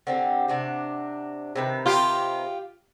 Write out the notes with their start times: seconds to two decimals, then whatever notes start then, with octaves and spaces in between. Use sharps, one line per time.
0.07 D3 C4 G4
0.48 C3 D4 F#4
1.56 C3 D#3 B4
1.86 F4 G4